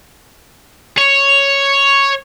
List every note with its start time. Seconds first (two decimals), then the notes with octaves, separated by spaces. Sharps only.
0.98 C#5